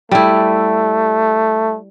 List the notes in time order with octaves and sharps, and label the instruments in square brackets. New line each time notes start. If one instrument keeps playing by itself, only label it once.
[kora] G3 E4 [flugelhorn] A3